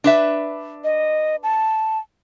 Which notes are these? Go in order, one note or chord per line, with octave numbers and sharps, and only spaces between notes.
D4 B4 E5
D#5
A5